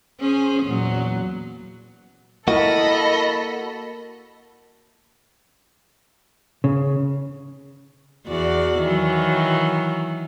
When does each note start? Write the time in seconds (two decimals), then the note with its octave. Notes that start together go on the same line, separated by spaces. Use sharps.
0.20 C#4 G#4 C5
0.63 E2 A#2 F#3
2.48 A#3 E4 F#4 A4 A#4 D#5 B5
6.64 C#3
8.28 E2 F#4 D5
8.80 D#3 E3 F#3